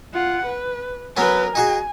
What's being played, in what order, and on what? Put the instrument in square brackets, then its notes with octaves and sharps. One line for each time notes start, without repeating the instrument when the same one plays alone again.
[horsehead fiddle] F4 F#5
B4
[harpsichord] F#3 B3 C#4 [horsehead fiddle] A#4 B4
[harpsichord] D#4 F#4 G#4 [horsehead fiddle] G#5